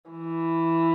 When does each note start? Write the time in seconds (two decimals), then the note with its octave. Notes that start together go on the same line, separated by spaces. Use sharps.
0.10 E3